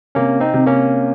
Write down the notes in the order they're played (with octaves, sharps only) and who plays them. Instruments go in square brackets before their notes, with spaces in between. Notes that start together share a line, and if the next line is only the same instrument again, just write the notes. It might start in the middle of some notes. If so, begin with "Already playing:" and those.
[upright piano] C3 [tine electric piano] A#3 C#4
[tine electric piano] C4 D#4
[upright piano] C3
[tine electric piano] A#3 C#4